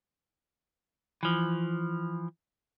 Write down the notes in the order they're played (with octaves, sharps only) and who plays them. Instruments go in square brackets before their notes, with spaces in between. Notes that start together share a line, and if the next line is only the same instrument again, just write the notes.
[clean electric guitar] E3 F3